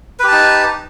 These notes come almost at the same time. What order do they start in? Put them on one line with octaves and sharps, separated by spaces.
B4 G4 A5 D#4